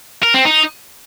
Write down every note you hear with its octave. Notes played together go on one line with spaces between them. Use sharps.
A#4
C4
D#4